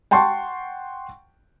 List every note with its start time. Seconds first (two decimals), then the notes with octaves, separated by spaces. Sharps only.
0.11 F#5 G5 A5 C6 C#6